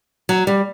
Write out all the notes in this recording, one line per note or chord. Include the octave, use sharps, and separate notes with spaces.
F#3
G3